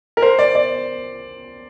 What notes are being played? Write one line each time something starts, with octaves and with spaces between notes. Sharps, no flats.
A#4
C5
D5
D5